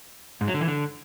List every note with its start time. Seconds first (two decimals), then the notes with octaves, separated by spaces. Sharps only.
0.41 G#2
0.48 F#3
0.54 D3
0.61 E3
0.68 D3